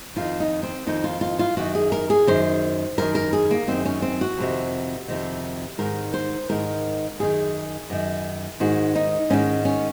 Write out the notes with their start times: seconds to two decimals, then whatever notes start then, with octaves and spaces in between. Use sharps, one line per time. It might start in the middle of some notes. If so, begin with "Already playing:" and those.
0.16 F2 D#3 F4
0.40 D#4
0.63 C4
0.87 F2 D#3 D#4
1.04 F4
1.21 F4
1.39 F4
1.57 F#2 D#3 F#4
1.75 G#4
1.92 A#4
2.10 G#4
2.27 F#2 D#3 C5
2.98 F#2 D#3 A#4
3.15 A#4
3.33 G#4
3.51 A#3
3.67 F#2 D#3 C4
3.85 C#4
4.02 C4
4.21 F#4
4.37 F2 C3 D#3
5.08 F2 C3 D#3
5.78 G#2 D#3 A#4
6.14 C5
6.49 G#2 D#3 A#4
7.19 F#2 D#3 G#4
7.90 F#2 D#3
8.60 G#2 D#3 F#4
8.95 D#4
9.30 G#2 D#3 C#4
9.65 C#4